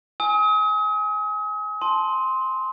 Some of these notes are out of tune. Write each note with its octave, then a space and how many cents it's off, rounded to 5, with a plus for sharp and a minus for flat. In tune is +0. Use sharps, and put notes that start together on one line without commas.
G#5 +0 D#6 +40
A5 -15 C6 +0